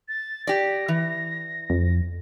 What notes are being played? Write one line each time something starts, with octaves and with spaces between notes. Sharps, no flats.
A6
G4 D5 A#6
E3
F2